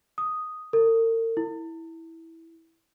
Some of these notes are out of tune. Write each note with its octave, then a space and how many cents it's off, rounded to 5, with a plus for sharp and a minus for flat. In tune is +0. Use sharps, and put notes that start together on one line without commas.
D#6 +0
A#4 -45
E4 -10